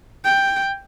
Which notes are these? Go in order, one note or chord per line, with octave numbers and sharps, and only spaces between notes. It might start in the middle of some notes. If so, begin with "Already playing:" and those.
G5